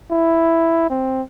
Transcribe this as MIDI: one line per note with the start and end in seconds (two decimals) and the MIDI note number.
0.11 0.86 64
0.90 1.22 60